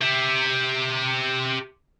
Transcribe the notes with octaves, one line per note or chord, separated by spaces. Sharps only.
G4 E5